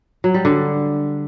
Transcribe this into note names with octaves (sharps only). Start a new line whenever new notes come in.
F#3
G3
D3